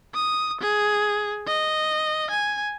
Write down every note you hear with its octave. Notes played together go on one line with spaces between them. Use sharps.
D#6
G#4
D#5
G#5